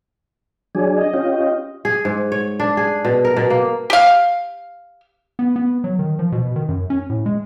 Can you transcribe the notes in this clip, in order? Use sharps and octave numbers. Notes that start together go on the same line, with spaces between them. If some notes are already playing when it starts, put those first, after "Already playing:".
F#3 D4 G#4
D#5
C#4 F4 G4
G#4
G#2
C#5
D4
G#4
B2
A#4
B2
A#3
G4 F5
B3
B3
F#3
D#3
F3
B2
D#3
F#2
C#4
A2
G#3